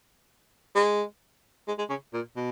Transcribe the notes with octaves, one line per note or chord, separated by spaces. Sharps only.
G#3
G#3
G#3
C#3
A#2
B2